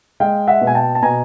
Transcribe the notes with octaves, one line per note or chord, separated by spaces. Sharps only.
G#3 F5 G5
E5 F#5
B2
G#5
G5 A5
A5
B2 G#5 A#5